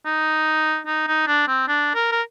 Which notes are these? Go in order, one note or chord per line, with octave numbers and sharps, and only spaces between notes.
D#4
D#4
D#4
D4
C4
D4
A#4
A#4